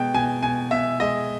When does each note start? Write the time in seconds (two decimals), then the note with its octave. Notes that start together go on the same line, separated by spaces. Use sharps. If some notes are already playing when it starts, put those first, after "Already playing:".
Already playing: B2 G#3 G5
0.14 B2 G#5
0.43 B2 G#5
0.71 B2 E5
1.00 G#3 D#5